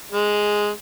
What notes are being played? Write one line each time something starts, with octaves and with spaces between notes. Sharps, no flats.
G#3